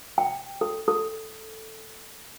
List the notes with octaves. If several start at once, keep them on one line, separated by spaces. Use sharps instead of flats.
G5
A4
A4